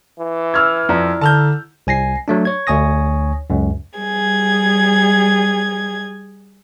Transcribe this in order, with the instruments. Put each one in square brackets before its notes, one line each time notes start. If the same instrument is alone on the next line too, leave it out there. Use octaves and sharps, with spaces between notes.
[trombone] E3
[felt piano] E6 F6 G#6
[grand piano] F2 [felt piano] E4 D5 A#5
[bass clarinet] D3 [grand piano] A5 F6 G6
[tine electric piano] C2 G#5 A#6 C7
F#3 A3 D4
C#5 G#6
D2 C#5 G#5 D#6 A#6
C#2 F#2
[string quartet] G3 G#4 G#6